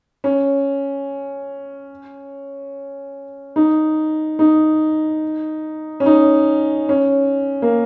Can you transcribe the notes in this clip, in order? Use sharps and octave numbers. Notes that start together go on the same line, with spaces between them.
C#4
D#4
D#4
C#4
D#4
C#4
A#3